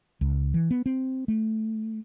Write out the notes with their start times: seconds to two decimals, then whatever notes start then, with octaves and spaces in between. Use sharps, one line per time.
0.21 C#2
0.54 E3
0.71 B3
0.86 C4
1.28 A3